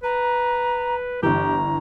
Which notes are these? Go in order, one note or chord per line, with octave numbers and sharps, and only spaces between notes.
B4 A#5
G1 E3 G4 A#5